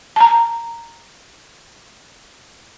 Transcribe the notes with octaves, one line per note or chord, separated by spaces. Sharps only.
A5 A#5